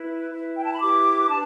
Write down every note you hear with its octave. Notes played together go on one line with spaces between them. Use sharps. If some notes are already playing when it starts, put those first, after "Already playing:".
Already playing: E4 B4
E4 B4
G5
A5
B5
E4 G4 B4 D6
D4 B4 A5